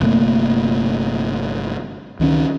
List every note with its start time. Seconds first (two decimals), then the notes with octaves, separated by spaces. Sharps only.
0.01 G1 C3 A3 A#3
2.20 C#2 D#3 A3 C#4